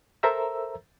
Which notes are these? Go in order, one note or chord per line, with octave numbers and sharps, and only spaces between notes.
A4 A#4 C5 E5 A#5 E6